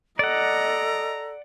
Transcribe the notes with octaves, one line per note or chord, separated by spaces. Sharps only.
A4 D5 D#5 F#5 A#5